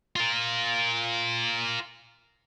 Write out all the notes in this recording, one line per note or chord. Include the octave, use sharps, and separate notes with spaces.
F4 A#4